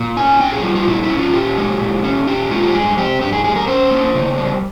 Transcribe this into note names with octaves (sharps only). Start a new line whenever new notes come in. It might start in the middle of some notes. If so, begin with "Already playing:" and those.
Already playing: A#2
C#4 G#5
A#2 G5
G#4
G3 F4
F4
A#2 E4
E4
C#4
F4
A#2 G4
G#3
A#2
C#4
A#2 G4
G#3 F4
G4
G2 G#4
C4 G4
G2 G4
G#4
G3 G#4
A#4
C#4 C5
A#3
C#3
G3